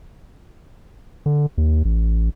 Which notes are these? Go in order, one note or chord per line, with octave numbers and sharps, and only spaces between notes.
D3
D#2
A1